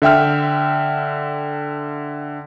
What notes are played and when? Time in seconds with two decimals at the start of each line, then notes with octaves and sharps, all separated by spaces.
0.02 D3 E5 G5 F6